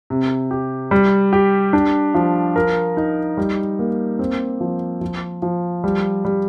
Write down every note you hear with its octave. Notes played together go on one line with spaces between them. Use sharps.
C3
G4
G3
G4
D4
F3
A#4
D#4
G3
A#3
C4
F3
F3
F3
G3
G3